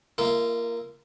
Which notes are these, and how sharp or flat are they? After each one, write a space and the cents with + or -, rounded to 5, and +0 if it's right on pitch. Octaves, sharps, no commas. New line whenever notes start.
A#3 +0 F4 -30 E5 -25